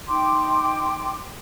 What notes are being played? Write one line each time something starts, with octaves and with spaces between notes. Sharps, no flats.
D#4 G5 C6 D6